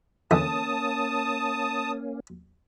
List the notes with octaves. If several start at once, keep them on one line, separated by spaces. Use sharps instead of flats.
E2 D3 A#3 C#4 A5 D#6